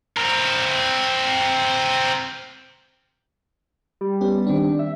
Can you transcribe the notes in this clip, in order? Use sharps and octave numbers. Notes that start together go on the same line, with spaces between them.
C4 A#4
G3
B3 C#4 G4
D#3 C4 D4
E5